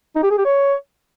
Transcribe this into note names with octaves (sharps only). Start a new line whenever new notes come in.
D#4
G4
G#4
G4
C#5